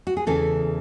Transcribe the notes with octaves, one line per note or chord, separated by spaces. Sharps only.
F#4
G#4
E2 C#3 E3 A4